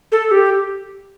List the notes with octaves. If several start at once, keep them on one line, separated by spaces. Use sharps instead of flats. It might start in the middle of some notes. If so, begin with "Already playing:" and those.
A4
G4